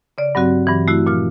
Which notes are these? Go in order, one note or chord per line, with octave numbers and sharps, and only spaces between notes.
C#3 D5
G2 F#3 C4 F#4
G2 E3
A3 E4 F#4
A#2 F3 F6